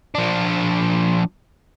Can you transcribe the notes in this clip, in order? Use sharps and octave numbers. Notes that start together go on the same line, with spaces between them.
F3 D4